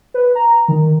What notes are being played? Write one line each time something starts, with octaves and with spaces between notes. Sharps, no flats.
B4
A#5
D#3